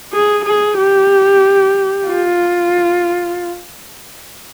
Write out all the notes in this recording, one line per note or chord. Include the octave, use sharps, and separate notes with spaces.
G#4
G#4
G4
F4